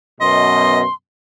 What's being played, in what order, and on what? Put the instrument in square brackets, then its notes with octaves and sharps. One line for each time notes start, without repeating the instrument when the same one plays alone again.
[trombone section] F#2 B2 [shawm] D#5 [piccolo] C6